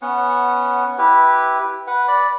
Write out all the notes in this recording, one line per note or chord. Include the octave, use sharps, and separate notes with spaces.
B3 C#4 F#5
E4 G4 B4
B4 F#5
D5 B5